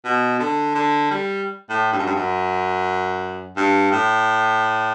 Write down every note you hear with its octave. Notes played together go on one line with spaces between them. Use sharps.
B2
D3
D3
G3
A2
G2
F#2
G2
F#2
G2
A2